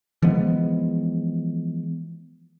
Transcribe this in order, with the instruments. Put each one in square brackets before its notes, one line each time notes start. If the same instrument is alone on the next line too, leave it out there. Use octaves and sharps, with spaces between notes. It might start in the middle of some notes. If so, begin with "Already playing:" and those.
[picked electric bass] E3 F3 G#3 B3